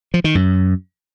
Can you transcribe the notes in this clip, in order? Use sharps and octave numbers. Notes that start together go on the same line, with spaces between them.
F3
D#3
F#2